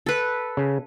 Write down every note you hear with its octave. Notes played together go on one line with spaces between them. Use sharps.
A4 B4
C#3